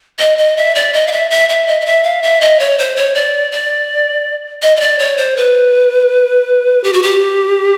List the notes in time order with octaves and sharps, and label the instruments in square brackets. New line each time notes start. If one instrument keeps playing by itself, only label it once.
[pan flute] D#5
D#5
E5
D5
D#5
F5
E5
E5
E5
D#5
D#5
E5
F5
E5
D#5
C#5
C5
C#5
D5
D5
D#5
D#5
D5
C#5
C5
B4
G4
F#4
G4